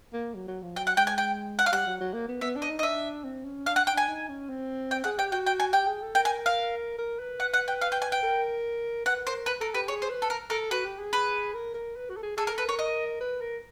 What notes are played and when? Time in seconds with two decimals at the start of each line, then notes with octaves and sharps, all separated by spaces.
0.13 A#3
0.35 F#3
0.48 F#3
0.62 F3
0.76 F#3 G5
0.87 F#5
0.97 G#3 G5
1.07 G#5
1.18 G5
1.59 F#5
1.66 F5
1.72 G3 F#5
1.87 F#3
2.01 F#3
2.14 A#3
2.28 B3
2.41 B3 E5
2.56 D4
2.62 D#5
2.70 D#4
2.79 D#5
2.83 D4 E5
3.24 C4
3.45 C#4
3.66 D4 F5
3.76 F#5
3.87 G5
3.93 D4 G#5
4.08 D#4
4.29 C#4
4.49 C4
4.91 G5
5.04 G#4 F#5
5.18 G4 G5
5.32 F#4 G5
5.46 G5
5.60 G#5
5.73 G4 G5
5.87 G#4
6.02 A4
6.15 A#4 G5
6.25 G#5
6.46 F5
6.99 A#4
7.19 B4
7.40 F#5
7.54 F#5
7.68 G5
7.81 F5
7.92 G5
8.02 G#5
8.12 G5
8.23 A#4
9.06 B4 F#5
9.27 A#4 C5
9.46 B4
9.60 A4 A#4
9.74 G4 B4
9.88 G#4 C#5
10.02 C5
10.10 B4
10.22 A4
10.30 A#4
10.50 A4 A#4
10.71 F#4 B4
10.85 G4
10.99 G#4
11.13 B4
11.54 A#4
11.74 A#4
11.96 B4
12.10 F#4
12.17 A4
12.23 G#4
12.37 G#4 A4
12.47 A#4
12.51 A4
12.58 B4
12.65 A#4 C#5
12.79 D#5
13.20 B4
13.41 A#4